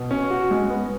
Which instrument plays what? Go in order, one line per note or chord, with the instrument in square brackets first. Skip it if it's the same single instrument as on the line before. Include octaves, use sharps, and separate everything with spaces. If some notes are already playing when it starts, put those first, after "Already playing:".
Already playing: [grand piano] B2
C#4
F#4
G#3
B3